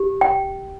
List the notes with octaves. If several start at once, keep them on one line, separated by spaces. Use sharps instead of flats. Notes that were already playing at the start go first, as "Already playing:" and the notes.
Already playing: G4
G5